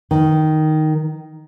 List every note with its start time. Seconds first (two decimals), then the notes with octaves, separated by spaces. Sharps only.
0.11 D#3